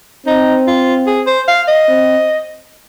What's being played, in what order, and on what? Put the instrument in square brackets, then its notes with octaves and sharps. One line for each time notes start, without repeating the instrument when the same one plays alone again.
[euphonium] C4 [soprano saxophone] D#4
[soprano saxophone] F4
G#4
C5
F5
D#5
[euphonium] C4